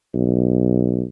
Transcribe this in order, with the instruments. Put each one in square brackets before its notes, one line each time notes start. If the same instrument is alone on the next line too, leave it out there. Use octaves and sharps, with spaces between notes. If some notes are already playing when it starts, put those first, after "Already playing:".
[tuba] B1